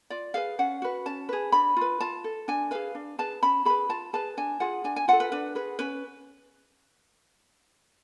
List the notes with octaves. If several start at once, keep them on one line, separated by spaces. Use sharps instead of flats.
F4 D5
G#4 B4 F5
C#4 F#5
F#4 B4
C#4 A5
G#4 B4
D4 B5
F4 B4
F4 A5
A4
D4 G#5
G#4 B4 F5
D4
G#4 B4 A5
C#4 B5
G#4 B4 B5
F4 A5
G#4 B4 A5
D4 G#5
F4 G#4 F#5
D4 G#5
G#5
F4 A4 F#5
B4
D4 B4
G#4 B4
C#4 B4